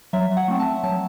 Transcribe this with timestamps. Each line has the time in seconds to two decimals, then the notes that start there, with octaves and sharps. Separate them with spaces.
0.13 F#3 E5
0.37 F#5
0.48 A3 C4
0.60 A5
0.83 F#3 A5